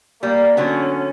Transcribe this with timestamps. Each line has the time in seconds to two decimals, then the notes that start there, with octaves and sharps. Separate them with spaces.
0.23 G3 A#3
0.57 D3 F#3 B3 C#4